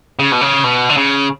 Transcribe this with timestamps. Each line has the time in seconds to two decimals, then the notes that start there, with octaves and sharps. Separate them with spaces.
0.19 C#3
0.32 B2
0.41 C#3
0.64 B2
0.89 D3
0.97 C#3